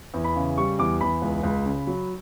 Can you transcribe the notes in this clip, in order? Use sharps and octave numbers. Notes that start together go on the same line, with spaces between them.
E2
B5
C#3
G3 C#6
E2 D6
E2 B5
C#2
C#2
C#3
F#3